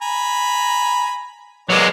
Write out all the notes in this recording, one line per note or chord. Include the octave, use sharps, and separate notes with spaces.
G#5 A#5 B5
F#3 G#3 A#3 B3 D5